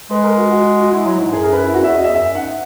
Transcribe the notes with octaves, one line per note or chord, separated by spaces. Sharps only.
G#3 B4
A#4
F#4
F#4
F#4
G#3 E4
F#3
G#2
F#2 G#4
A#4
B4
E4
F#2 F#4
E2 E5
E2 D#5
E5
F#2 E5
G#2 F#5